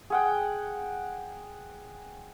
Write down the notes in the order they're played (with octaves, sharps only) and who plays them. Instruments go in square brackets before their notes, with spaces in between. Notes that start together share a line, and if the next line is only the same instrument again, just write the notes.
[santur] G#4 F#5 G5